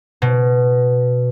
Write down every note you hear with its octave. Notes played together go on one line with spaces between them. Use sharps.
B2